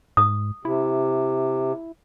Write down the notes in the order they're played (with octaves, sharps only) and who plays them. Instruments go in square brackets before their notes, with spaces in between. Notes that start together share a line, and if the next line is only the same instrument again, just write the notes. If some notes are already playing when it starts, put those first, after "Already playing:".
[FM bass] G#2 [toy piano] D#6
[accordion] C3 [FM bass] E4